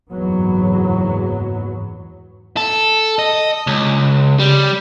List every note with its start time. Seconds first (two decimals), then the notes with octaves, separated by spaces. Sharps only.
0.11 F#1 E2 G#2 F#3 B3
2.57 A4
3.19 D#5
3.67 C#2
4.40 G3